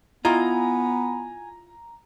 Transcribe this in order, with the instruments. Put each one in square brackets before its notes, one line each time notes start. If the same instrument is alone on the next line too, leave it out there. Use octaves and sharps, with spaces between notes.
[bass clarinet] B3 [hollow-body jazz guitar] E4 F4 D#5 [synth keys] G#5 [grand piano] A#5